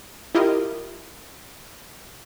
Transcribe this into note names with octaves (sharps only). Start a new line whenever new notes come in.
E4 F4 G4 A#4 D#5 F5